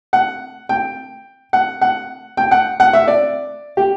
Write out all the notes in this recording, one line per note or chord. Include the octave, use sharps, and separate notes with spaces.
F#5
G5
F#5
F#5
G5
F#5
F#5
E5
D5
G4